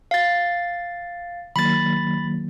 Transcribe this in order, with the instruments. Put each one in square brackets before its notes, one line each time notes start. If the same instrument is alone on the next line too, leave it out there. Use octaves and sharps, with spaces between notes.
[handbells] F5 A6
[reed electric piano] D#3 F#3 A#3 [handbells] B5 A6